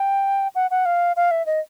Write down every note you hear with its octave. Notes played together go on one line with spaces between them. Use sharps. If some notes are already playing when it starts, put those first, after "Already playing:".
Already playing: G5
F#5
F#5
F5
F5
E5
D#5